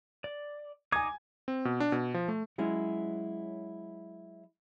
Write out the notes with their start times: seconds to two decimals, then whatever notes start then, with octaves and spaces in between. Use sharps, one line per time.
0.24 D5
0.92 D#4 G#5 D6 D#6 G#6
1.48 C4
1.65 B2
1.80 D4
1.92 B2
2.14 F3
2.28 A3
2.58 F#3 G#3 C#4 E4